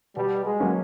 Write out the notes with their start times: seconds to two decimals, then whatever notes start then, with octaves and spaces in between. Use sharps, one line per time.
0.16 B2 G3
0.45 G#3
0.60 F#3 A#3 C#4